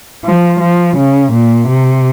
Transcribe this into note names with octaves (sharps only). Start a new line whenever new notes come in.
F3
F3
C#3
A#2
C3